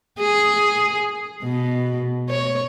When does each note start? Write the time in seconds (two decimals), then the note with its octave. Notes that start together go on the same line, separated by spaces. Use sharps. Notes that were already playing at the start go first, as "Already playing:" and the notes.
0.20 G#4
1.43 B2
2.30 C#5